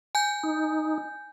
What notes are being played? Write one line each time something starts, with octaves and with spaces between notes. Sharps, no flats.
G#5 G6
D#4